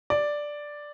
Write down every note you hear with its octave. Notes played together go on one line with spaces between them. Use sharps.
D5